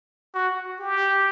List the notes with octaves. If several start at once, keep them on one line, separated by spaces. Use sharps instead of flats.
F#4
G4